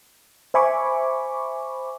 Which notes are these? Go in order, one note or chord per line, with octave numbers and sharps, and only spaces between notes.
C5 E5 G#5 B5 C#6 D6